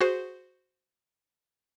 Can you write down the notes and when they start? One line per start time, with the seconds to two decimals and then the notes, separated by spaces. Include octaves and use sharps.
0.01 F#4 G#4 C5